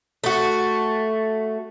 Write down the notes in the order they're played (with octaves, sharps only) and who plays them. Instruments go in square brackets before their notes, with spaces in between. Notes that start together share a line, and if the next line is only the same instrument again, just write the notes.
[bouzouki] A3 F#4